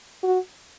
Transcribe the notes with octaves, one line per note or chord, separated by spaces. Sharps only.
F#4